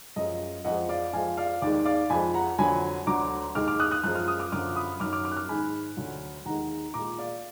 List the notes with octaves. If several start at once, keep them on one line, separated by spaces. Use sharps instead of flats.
F#2 F3 G#3 D#5
F2 F3 G#3 D#5 F#5
D5 F5
F2 F3 G#3 F5 G#5
D5 F5
D#2 D#3 G#3 D5
D5 F5
F2 F3 G#3 G#5 B5
F#5 A#5
F2 D3 F#3 G#5 B5
D2 D3 F#3 A#5 D6
D#2 D#3 G#3 D6 F6
D6 F6
D#6 F#6
D#6 F#6
F#2 F3 G#3 F#6
F6
D#6
D6 F6
F#2 D3 F3 D6 F6
B5 D#6
F#2 D#3 F#3 D6 F6
D6 F6
D6 F6
F#6
D6 F6
G#2 D#3 G#3 G#5 B5
D2 D3 F#3
D#2 D#3 G#3 F#5 A#5
A#2 G#3 A#5 D6
D5 F5